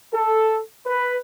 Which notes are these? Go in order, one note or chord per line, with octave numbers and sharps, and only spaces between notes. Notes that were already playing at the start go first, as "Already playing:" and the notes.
A4
B4